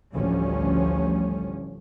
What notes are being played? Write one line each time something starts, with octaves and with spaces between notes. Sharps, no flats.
A1 D2 F3 G3 C#4